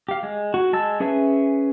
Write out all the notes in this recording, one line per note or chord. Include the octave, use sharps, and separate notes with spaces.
G4 F5
G#3
F#4
G#3 A5 E6
C#4 G#4 B4 E5